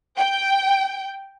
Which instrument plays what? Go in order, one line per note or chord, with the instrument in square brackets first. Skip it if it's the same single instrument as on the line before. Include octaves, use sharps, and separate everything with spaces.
[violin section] G5